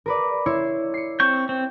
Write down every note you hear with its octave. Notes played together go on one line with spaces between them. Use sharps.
A#4 B4 D5
E4 C#5 C6
C7 C#7
C4 C#6 G6
C4